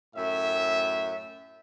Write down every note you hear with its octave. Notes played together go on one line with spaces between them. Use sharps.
F#2 A2 E5